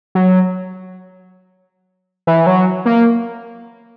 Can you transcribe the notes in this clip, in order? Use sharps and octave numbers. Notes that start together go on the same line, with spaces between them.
F#3
E3
F#3
A#3